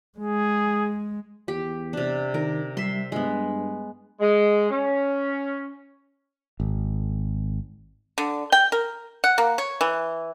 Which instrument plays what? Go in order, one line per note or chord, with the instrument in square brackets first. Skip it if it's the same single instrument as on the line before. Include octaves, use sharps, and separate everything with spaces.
[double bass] G#3 [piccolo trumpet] G#4
[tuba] E2 [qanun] G4
[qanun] C3 D4
[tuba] D#3 [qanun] A#4
[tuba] G3 [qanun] E5 C6
[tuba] G2 [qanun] G#3 B3
[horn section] G#3
C#4
[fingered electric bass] G#1
[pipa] D3
G5
A#4
F#5
A#3
C#5
E3